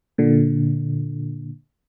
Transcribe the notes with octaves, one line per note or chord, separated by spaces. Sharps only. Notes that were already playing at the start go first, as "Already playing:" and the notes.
A#2 D3